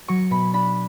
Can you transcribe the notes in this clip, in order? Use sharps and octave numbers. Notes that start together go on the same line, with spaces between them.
F#3 C#6
B2 B5
D4 B5